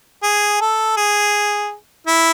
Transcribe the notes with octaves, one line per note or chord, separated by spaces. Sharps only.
G#4
A4
G#4
E4